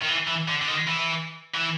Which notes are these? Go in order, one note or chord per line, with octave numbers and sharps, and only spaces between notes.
D#3
E3
E3
D3
D3
D#3
E3
E3